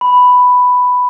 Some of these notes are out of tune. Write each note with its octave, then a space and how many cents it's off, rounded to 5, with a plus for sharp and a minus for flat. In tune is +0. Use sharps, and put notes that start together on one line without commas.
B5 +5